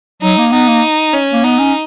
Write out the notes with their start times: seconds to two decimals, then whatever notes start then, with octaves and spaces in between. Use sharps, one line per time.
0.22 F#3 D#4
0.38 A#3
0.52 B3 D#4
0.68 A#3
1.13 C#4
1.33 A#3
1.44 B3 D#4
1.59 C#4